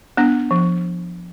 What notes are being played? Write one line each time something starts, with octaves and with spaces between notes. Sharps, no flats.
B3 D4
F3